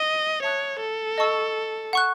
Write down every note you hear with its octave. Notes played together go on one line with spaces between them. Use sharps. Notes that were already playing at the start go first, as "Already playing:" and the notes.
Already playing: D#5
C#5 E5 A5 D#6 F#6
A4
D#5 A5 C#6 E6
F#5 C#6 F#6